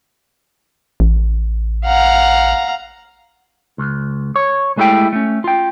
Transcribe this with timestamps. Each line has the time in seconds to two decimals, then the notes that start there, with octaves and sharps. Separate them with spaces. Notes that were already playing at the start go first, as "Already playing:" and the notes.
1.00 A1
1.85 F5 F#5 A#5
3.78 C#2
4.36 C#5
4.77 G#3 A3 E4 G4 G5
5.13 A3 C#4
5.44 F4 G5